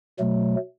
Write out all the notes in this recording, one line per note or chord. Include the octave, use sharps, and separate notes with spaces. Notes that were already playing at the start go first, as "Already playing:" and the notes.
B2 F#3 A3